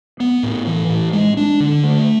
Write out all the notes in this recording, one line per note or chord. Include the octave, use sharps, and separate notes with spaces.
B3
A2
E3
A2
G#3
D4
D3
A3